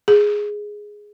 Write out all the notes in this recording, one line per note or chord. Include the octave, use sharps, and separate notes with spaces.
G#4